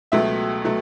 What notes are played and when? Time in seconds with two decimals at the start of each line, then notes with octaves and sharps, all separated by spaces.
0.12 C#2 B2 F#3 A3 E5
0.64 B2 F#3 A3